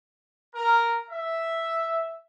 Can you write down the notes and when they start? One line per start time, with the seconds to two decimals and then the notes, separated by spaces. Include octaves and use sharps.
0.54 A#4
1.09 E5